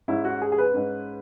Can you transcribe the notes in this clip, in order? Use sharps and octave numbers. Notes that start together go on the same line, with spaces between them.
G#2 G#3 C#4 E4
F#4
G#4
G#4
B4
G#2 G#3 C#4